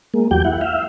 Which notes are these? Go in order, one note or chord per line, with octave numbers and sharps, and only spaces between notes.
G#3 A#3
E2 F#3 G4 G5 G6
E4 F#5
E5 F5